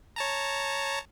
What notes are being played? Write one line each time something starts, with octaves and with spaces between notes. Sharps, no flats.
C#5 A5 A#5